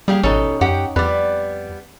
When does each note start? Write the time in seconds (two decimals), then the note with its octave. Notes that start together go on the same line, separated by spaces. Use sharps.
0.08 G3 A#3 G4 G#4
0.24 A1 B2 C#4 D#4 A4
0.61 F#2 G4 F#5 G5
0.96 F2 G3 B3 B4 D5